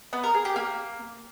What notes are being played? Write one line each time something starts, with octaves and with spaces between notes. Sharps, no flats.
B3
A#4
G#4
G4
A#3